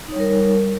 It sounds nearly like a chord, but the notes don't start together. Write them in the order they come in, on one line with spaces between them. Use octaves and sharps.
D#4 C#5 G3 A#4